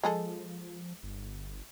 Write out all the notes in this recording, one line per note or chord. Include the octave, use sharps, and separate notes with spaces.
F3 G#3 G#4 A4
G1